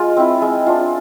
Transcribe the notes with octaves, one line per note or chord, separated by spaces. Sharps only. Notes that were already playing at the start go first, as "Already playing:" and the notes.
Already playing: G#3 F4
C4 E4
G#3
D4 F4